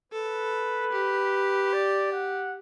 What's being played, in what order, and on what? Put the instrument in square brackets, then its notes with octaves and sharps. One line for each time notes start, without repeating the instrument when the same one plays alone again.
[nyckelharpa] A4 [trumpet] B4
[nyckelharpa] G4
[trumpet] D5
F#5